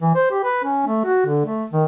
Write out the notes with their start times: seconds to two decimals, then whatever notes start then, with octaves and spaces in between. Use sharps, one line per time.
0.01 E3
0.15 C5
0.31 G4
0.44 B4
0.64 C#4
0.86 A3
1.05 F#4
1.27 D3
1.45 A3
1.72 D#3